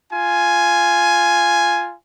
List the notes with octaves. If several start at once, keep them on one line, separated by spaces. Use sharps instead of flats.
F4 G#5